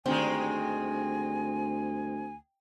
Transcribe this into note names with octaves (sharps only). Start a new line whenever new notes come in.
D2 G2 D#3 G#3 C4 G#5